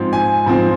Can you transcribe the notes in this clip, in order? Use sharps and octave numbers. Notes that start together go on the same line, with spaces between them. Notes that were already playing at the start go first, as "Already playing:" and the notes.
Already playing: G#2 F3 C4
G#5
G#2 F3 C4